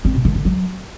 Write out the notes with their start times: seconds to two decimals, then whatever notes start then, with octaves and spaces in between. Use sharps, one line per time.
0.05 C4
0.15 B2
0.25 D#3
0.35 D3
0.45 F#3